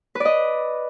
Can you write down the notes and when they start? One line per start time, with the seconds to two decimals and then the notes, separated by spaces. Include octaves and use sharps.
0.15 B4
0.20 D5
0.25 D#5